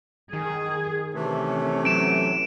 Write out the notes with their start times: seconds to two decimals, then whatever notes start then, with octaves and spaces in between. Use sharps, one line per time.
0.33 D#3 G#4
1.14 C3 E3 A3 C#4
1.85 F#3 D7 E7